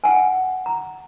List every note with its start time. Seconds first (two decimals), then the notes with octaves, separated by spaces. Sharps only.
0.04 F#5 G#5
0.66 A#5